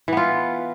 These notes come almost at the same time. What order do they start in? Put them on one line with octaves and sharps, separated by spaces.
E3 B3 F4